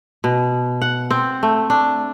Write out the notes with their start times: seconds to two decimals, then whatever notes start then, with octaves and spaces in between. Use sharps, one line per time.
0.24 B2
0.81 F#5
1.11 C4
1.43 A3
1.70 D4